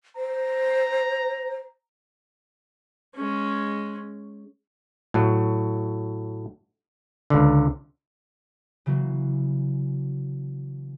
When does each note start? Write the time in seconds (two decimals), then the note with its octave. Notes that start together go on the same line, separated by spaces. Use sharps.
0.16 C5 A#5
3.16 G#3 C#4
5.14 A2 F#3
7.30 C#2 D3
8.86 C#3 E3 F#3 A#3